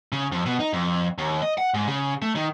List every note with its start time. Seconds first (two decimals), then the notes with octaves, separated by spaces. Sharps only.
0.12 C#3
0.32 F2
0.46 B2
0.60 D#4
0.73 F2
1.18 D#2
1.42 D#5
1.58 F#5
1.74 G#2
1.88 C#3
2.22 A3
2.36 D#3